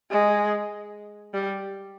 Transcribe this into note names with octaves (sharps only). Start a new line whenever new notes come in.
G#3
G3